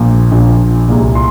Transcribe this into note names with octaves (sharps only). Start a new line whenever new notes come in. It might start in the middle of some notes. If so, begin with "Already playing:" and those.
Already playing: A#1 A#2 F3
A#1 A#2 F3
C2 A#2 G#3
C6